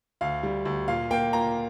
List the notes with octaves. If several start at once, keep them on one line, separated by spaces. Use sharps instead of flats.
D2 F5
G3
D2
A#2 F5
A#3 G5
A#2 A#5